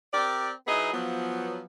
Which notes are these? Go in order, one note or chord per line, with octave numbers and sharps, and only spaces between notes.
C4 G4 A#4 D5
F#3 D#4 E4 G#4 B4 D#5
F3 F#3 B3